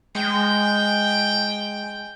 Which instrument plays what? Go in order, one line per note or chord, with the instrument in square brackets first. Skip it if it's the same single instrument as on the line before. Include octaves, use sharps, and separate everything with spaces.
[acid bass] G#3 [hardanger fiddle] G5